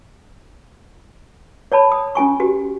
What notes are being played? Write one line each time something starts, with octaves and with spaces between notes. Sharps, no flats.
C#5 D5 A5 B5
D#6
C#4 F4 G#5 C#6
F#4 G4